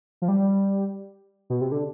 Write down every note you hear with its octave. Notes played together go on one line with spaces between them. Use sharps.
F3
G3
B2
C3
D3